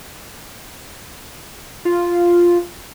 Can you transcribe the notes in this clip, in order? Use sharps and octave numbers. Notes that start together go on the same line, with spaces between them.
F4